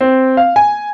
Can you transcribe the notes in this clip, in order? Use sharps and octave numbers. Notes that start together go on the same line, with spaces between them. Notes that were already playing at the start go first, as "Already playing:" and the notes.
C4
F5
G#5